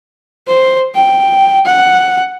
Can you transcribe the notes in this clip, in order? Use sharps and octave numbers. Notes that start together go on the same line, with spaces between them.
C5
G5
F#5